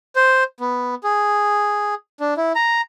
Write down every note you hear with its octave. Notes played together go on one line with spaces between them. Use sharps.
C5
B3
G#4
D4
E4
A#5